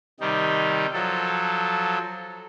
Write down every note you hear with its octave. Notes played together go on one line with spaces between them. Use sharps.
C3 D#3 G3 D#4
F3 F#3 A4